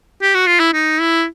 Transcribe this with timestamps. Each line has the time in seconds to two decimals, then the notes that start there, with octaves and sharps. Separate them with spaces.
0.22 G4
0.35 F#4
0.46 F4
0.60 E4
0.73 D#4
1.00 E4